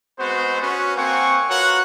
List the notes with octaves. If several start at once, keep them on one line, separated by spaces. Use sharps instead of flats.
G#3 B3 C4 F#4 C5
C#4 F#4 B4
A#3 C4 F#5 G#5 C#6
F4 F#4 A#4 B4 C#5 F#5